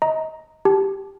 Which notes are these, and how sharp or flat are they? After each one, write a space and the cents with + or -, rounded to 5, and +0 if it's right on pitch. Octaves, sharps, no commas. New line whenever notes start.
D#5 +25 A#5 +0
G4 +0 A5 -25